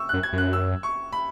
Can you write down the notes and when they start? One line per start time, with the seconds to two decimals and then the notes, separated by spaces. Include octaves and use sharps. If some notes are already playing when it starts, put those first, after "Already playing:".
Already playing: C#6 E6
0.09 F#6
0.13 F#2
0.23 G#6
0.33 F#2
0.38 F#6
0.53 E6
0.83 C#6
1.12 B5